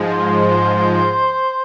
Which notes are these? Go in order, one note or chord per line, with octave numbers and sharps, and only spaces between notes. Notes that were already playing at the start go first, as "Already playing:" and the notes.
Already playing: G#2 F3 G#3
C5
C5